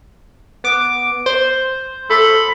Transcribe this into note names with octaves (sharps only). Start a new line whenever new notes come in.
B3 D6
C5
A4 B5